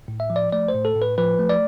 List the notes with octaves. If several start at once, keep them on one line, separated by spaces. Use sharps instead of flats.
A2
E5
F3
D5
A3 D5
C5
A2
A4
A2
B4
F3 B4
A3
D5